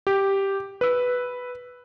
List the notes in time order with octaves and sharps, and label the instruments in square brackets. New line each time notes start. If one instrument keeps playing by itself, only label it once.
[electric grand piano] G4
B4 E6